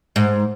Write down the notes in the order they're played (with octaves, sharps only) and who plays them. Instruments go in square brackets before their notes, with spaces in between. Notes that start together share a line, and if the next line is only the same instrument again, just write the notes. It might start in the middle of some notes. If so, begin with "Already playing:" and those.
[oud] G#2